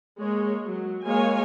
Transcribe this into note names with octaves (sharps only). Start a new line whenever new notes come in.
G#3 A#3 C#5
F#3
G#3 A#3 C#5 F5 G#5